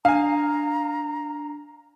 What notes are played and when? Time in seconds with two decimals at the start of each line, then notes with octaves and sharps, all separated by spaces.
0.05 D4 F5 G#5 A#5